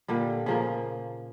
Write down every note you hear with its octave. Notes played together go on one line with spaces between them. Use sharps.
A#2 D3 G3
C#3 F3 A#3